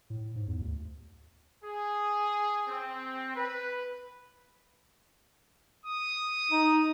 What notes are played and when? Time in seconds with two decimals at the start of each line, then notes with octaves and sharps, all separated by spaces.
0.10 A2
0.36 G#2
0.48 E2
0.61 D2
1.64 G#4
2.67 C4
3.36 B4
5.86 D#6
6.51 D#4